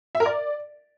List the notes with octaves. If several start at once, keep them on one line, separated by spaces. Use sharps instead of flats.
E5
A#4
D5